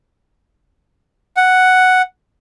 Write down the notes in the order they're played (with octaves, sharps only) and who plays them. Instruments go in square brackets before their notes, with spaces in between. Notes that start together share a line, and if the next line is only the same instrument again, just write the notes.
[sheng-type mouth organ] F#5